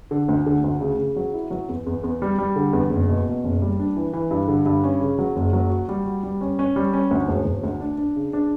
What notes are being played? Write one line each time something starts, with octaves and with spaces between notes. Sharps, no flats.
D3
D2
D3
D2
C#3
C#3
F#3
E4
F#3
E2
E2
E2
G3
G3
D3
E2
F#1
B2
B2
F#1
G3
D4
E3
E3
G2
D3
G2
C#4
C#3
F#3
F#1
F#3
F#4
G3
F#4
G3
C#4
C#4
G3
C#4
D2
E1
E1
D2
D4
D4
C#3
D4